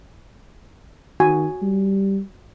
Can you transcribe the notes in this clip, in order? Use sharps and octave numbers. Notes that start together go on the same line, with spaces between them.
D#3 F#4 G#5
G3